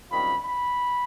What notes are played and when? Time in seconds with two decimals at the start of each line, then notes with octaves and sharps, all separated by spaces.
0.11 F#2 D#3 G3 C4 F4 B5
0.44 B5